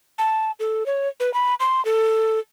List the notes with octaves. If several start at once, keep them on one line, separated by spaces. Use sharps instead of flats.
A5
A4
C#5
B4
B5
C6
A4